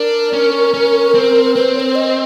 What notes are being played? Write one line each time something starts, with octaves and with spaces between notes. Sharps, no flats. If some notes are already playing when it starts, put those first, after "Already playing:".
Already playing: D4 A#4
C#4
C#4
C4
C4 B4
C#5
C5
D#5